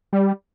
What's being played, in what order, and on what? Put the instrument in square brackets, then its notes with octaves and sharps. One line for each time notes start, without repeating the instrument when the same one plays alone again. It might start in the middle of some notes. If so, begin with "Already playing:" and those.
[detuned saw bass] G3